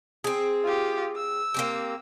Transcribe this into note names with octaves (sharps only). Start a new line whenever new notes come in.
C4 G#4
F4 G4
E6
A#3 C4 G4